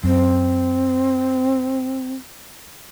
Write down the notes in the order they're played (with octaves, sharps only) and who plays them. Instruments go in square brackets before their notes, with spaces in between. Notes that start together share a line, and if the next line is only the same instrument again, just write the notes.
[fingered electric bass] F#2 [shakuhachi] C4